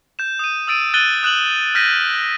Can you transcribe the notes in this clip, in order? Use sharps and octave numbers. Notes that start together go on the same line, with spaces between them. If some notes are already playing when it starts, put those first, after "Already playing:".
G6 E7
D#6 D#7
D#6 E6 A6 D7 D#7
F#6 A6 D#7 F#7 G7
D#6 F#6 E7 F#7
F6 G6 A#6 B6 D#7